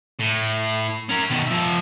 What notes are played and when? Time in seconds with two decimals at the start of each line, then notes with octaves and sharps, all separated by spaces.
0.19 A2
1.09 C#4 A#4
1.30 B2 D#3
1.47 F3 E5